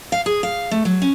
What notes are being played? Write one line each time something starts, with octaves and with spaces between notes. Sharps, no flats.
F5
G#4
F5
A3
F#3
C#4